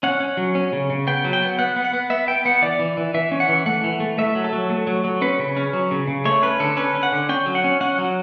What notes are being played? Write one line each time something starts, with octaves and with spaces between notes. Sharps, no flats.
C#4 F#5
C#4
F#3
C#4
C#3
C#3
B3 G5
F#3
G5
B3
B3 F#5
B3
F#5
B3
B3 E5
B3 G5
B3 F#5
E3 D5
E3
E3
E3 E5
C#4
F#5
E3
A3 F#5
E3
A3
A3 E5
F#3
A4
F#3
A3
F#3
F#3
C#4 B4
C#3
C#4
F#3
C#3
C#3
A3 C#5
C#4 B4
D3 A4
C#4 B4
C#4
F#5
D3
C#4 G5
F#3
F#5
C#4
C#4 F#5
F#3